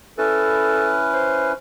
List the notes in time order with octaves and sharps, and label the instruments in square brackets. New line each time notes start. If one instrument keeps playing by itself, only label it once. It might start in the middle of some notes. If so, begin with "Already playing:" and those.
[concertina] C#4 E4 B4 [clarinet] A4
[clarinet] C5